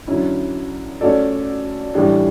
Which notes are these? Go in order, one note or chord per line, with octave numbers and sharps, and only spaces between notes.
D3 F#3 C#4 E4
A3 C#4 F#4 A4 D5
A2 E3 G3 D4